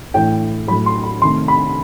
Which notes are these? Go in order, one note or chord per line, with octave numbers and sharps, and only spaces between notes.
A2 E3 A3 G5
A2 F#3 A3 B5
C6
B5
C3 D#3 A3 C6
B5